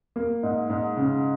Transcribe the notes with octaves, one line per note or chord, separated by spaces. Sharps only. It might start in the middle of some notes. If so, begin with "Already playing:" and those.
A#3
G#2
G#2
C#3